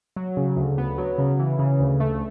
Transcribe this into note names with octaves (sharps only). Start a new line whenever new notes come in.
F#3
C#3
D2
B3
F#3
C#3
E3
C#3
D2
A3